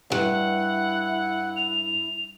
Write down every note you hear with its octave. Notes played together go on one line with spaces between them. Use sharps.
D2 G2 E4 F#5
F7